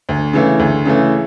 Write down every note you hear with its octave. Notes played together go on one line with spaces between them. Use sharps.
D2
C#3 E3 A3
D2
C#3 E3 A3